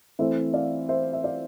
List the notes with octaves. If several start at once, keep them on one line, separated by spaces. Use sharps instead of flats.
E3 A3 C4 C5 E5
D5 F5
C5 E5
E5
D5 F5